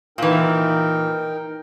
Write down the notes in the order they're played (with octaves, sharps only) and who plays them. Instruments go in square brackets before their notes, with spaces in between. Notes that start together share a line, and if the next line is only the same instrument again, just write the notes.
[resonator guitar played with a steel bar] A#2 E3 [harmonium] D#4 A#4 G5